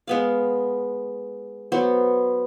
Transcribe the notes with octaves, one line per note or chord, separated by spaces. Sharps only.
G#3 B3 F5
F#3 B3 F#4 C5